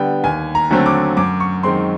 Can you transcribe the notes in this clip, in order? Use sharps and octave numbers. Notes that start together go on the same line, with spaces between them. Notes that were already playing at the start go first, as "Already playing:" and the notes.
Already playing: D3 G3 B3 D5 G5
D#2 G#5
A#5
D3 F#3 A3 C4
D6
F#2 D6
C#6
D#3 G#3 C4 C6